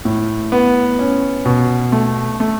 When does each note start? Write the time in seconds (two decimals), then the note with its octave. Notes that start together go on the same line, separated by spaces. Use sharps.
0.05 A2
0.52 B3
0.99 C#4
1.45 B2
1.92 A3
2.40 A3